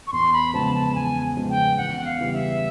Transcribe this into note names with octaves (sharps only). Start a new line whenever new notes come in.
C#6
E2 C6
B5
C#3 F3 G#3 B3 A5
A5
E2 G#5
C#3 F3 G#3 B3
G5
E2 F#5
F5
C#3 E3 G3
E5